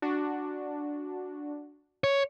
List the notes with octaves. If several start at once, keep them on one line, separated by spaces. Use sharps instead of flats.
D4 F#4
C#5